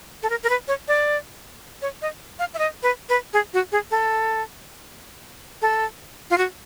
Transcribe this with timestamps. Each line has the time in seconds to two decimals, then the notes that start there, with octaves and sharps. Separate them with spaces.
0.23 A4
0.30 A#4
0.43 A#4
0.49 B4
0.68 C#5
0.88 D5
1.82 C#5
2.02 D#5
2.39 F5
2.54 E5
2.59 D#5
2.83 B4
3.09 B4
3.33 G#4
3.54 F#4
3.72 G#4
3.91 A4
5.62 A4
6.30 F4
6.38 F#4